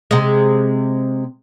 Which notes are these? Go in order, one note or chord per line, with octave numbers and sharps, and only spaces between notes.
C3 G#3